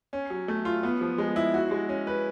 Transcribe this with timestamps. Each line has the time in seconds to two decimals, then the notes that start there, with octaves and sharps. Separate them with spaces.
0.13 C#4
0.30 F#3
0.48 A3
0.65 F4
0.83 B3
1.01 F3
1.18 G#3
1.36 E4
1.54 F#4
1.71 G#3
1.89 C#4
2.07 B4